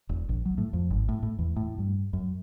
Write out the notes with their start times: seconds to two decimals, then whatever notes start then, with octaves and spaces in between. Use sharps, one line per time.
0.09 E1
0.29 A#1
0.45 F#3
0.58 A2
0.73 F2
0.91 G#1
1.09 A2
1.23 A2
1.39 E2
1.57 A2
1.78 G2
2.13 F#2